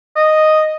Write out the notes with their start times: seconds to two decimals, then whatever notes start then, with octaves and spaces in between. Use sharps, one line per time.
0.16 D#5